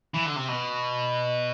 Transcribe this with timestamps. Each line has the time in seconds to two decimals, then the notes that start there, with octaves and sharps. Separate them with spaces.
0.14 E3
0.26 D3
0.36 C3
0.48 B2